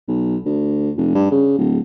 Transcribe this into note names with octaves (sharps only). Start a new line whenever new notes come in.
B1
D2
F1
G2
C#3
D1